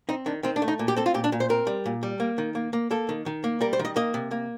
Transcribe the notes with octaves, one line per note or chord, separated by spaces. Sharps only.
C4 D#4
D#3 D4
D#3 C4
D4
A3
D#4
A#2
G4
C4 A4
F4
A#2 G4
D4
A#2
C5
C4 A#4
G3
A#2
G3
A#3
D#3
A#3
A#3
A#3 A4
D#3
D#3
A#3
G3 A#4
C5
D#3
D#5
A#3 D#5
C3
A#3